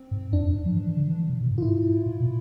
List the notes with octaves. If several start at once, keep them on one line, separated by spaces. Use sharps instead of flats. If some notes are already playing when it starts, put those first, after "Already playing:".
Already playing: C4
G#2
F2 D4
F2
G#2
F3
E3
E3
D3
E3
E3
C3
B2
G#2
F4
G#2 E4
A2
B2